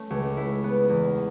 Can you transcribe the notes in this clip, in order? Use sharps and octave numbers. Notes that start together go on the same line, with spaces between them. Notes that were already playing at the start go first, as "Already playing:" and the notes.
Already playing: A3 C#4
C#2
E4
B3
E2